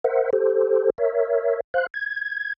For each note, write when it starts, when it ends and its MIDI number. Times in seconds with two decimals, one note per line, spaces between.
0.04 0.30 70
0.04 0.30 72
0.04 0.30 76
0.04 0.30 78
0.33 0.90 67
0.33 0.90 69
0.33 0.90 72
0.98 1.60 70
0.98 1.60 73
0.98 1.60 76
1.74 1.87 72
1.74 1.87 77
1.74 1.87 90
1.94 2.54 92